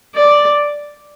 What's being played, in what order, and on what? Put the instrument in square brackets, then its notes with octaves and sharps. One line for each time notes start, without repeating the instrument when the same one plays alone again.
[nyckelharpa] D5